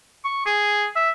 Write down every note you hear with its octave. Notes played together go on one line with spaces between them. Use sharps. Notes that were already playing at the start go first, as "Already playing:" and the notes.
C#6
G#4
E5